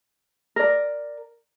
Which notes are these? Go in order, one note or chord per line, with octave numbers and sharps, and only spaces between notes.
A#4 D5